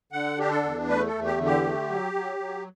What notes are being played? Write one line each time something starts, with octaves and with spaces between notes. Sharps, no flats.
D3 F#5
D4 G4
A4
E2
A3 B4
A4
E2
G4
D3
G4
A3
F#3
F#3
F#3